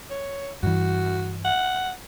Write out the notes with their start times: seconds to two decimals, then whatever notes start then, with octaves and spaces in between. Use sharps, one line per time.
0.11 C#5
0.63 G2 E3 F#4
1.45 F#5